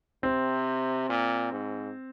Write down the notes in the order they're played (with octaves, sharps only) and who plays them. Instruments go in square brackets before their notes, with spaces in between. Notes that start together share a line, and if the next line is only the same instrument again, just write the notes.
[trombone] C3 [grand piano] C4
[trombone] A#2
G#2